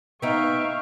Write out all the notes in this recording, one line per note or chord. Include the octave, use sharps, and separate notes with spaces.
B3 D#4 E5 F5 G5 C#6